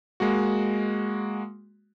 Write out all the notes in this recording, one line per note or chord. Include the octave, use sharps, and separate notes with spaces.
G#3 A#3 F#4